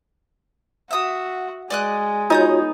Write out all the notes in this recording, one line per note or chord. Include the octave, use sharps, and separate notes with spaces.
F#4 E5 D#6
G#3 D5 D#5 F#6
B3 D#4 F4 F#4 C#5 D#6 G6